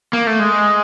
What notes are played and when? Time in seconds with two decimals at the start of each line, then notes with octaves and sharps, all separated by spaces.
0.13 A#3
0.27 A3
0.40 G#3